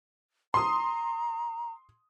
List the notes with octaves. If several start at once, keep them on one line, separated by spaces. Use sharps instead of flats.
A#5 C6 D#6